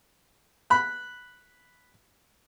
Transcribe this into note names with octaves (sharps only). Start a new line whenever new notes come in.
B5 F#6